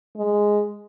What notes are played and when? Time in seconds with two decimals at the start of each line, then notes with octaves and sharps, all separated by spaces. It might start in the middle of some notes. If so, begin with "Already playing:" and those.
0.17 G#3